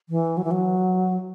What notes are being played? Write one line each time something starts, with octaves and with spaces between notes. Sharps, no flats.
E3
F#3
E3
F#3